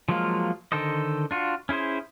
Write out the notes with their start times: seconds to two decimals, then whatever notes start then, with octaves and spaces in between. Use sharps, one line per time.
0.09 F3 F#3 G#3 A#3 F4
0.72 D3 D#3 A4 C5 D#5
1.31 D4 F4 F#4
1.69 C#4 E4 G#4 C5